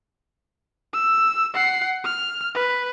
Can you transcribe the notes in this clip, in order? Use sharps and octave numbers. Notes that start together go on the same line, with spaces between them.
E6
F#5 C7
F6
B4